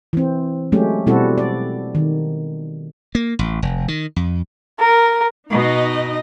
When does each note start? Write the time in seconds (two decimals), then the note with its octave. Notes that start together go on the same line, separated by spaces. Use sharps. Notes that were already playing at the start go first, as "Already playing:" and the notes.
0.13 E3 C4
0.72 F#3 G#3 A3 C#4 G4
1.06 B2 G3 C4 E4 F#4 A4
1.38 D5
1.95 D#3
3.15 A#3
3.39 A1
3.63 F1
3.88 D#3
4.16 F2
4.79 A#4
5.50 B2 D#4 D#5